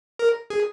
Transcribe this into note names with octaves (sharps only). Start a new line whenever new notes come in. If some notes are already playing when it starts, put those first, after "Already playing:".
A#4
G#4